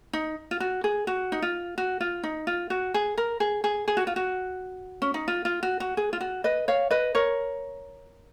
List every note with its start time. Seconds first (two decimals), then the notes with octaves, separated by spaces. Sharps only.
0.13 D#4
0.51 F4
0.60 F#4
0.84 G#4
1.07 F#4
1.32 D#4
1.42 F4
1.78 F#4
2.00 F4
2.23 D#4
2.47 F4
2.70 F#4
2.94 G#4
3.18 A#4
3.40 G#4
3.64 G#4
3.88 G#4
3.97 F#4
4.07 F4
4.16 F#4
5.02 C#4
5.14 D#4
5.28 F4
5.45 F4
5.63 F#4
5.80 F#4
5.97 G#4
6.13 F4
6.21 F#4
6.44 B4 D#5
6.68 C#5 F5
6.91 B4 D#5
7.15 A#4 C#5